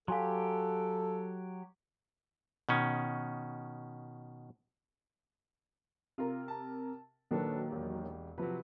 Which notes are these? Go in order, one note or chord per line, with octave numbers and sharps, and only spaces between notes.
F#3 G4 A4 F5 G#5 C6
B2 D#3 C#4
C3 F4 A#4
A5
A#2 D#3 F#3 D4 A4 B4
E1 G4
C3 F3 F#3 B4